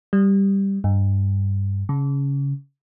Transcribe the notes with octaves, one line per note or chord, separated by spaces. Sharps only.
G3
G2
C#3